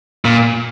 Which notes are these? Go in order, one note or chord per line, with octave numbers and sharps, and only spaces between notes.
A#2